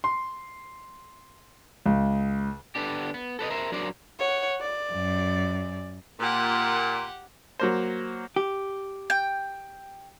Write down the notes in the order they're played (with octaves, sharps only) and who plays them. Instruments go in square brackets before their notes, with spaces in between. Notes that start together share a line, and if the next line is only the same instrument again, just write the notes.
[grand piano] C6
C#2
[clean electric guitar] D3 B3 D4 G4
B3
A4 B4 D5 D#5
A#4 C5 E5
F#3 D4 A#4 C5 D5
[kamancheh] C#5 F#5
D5
[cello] F#2
[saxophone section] A#2 [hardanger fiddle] G4 F#5
[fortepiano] F#3 A#3 C5
[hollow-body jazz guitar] G4
[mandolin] G5